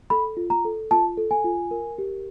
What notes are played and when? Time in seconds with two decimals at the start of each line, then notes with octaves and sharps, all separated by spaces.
0.10 A4 B5
0.37 F4
0.50 A#5
0.65 A4
0.91 F4 A5
1.17 A4
1.31 G#5
1.44 F4
1.71 A#4
1.98 G4